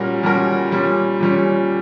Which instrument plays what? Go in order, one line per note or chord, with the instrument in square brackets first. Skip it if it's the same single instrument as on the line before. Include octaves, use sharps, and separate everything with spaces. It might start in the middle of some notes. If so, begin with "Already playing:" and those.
Already playing: [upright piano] A#2 G3 C#4 F#4 A#4
A#2 G3 C#4 F#4 A#4
A#2 G3 C#4
A#2 G3 C#4